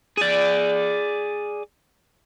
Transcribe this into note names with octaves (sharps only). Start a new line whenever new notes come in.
G#4 D5